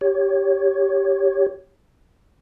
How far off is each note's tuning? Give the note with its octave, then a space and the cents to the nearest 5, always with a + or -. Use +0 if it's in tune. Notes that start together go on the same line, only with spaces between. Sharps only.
G4 +0 C#5 +0